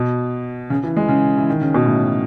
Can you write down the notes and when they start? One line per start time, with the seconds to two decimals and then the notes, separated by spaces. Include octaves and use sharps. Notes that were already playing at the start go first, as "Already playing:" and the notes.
Already playing: B2
0.70 C#3
0.83 E3
0.96 G#3
1.09 C#3
1.37 E3
1.50 D#3
1.61 C#3
1.74 B2
1.86 A2